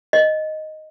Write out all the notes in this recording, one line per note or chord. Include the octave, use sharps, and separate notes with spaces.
D#5